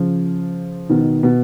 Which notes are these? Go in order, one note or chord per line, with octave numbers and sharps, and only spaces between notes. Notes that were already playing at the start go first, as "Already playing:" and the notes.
Already playing: C#3 F3
B2 D#3
B2